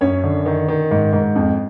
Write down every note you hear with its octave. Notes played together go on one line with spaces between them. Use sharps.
F#2 C#4 C#5
D3
D#3
D#3
G#2
G#2
F2